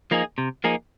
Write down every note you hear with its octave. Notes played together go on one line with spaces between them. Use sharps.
F3 A#3 D#4 G#4
C3
F3 A#3 D#4 G#4